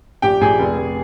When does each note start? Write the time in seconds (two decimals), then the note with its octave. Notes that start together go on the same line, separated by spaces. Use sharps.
0.22 A#1 G4 G5
0.41 A#1 G#4 G#5
0.59 F1
0.78 F1